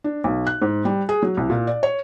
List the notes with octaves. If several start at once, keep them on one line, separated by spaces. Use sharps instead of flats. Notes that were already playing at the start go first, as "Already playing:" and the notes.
D4
B1
F#6
G#2
G3
G#4
F#3
C2
A#2
D5
C#5